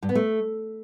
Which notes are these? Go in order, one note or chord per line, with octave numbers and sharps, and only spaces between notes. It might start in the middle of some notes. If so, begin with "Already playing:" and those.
G2
B3
A3